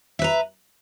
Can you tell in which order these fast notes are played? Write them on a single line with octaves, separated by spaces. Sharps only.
E5 B4 A#5